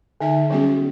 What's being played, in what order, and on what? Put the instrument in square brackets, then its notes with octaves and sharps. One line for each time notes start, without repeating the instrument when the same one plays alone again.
[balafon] D3 D#4 E5
F#3 G3 B3 C#4 F#4 G#4